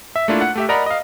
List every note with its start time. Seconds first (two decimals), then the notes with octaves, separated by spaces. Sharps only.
0.16 E5
0.28 A3 A#3 D4 E4 F4
0.41 F#5
0.55 A3 G4 E5
0.69 A#4 D5 D#5 F#5 A#5 B5
0.86 D#5 F5